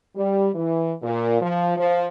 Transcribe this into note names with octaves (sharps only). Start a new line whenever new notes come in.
G3
E3
A#2
F3
F3